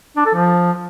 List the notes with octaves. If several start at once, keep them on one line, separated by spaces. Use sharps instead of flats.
D4
A4
F3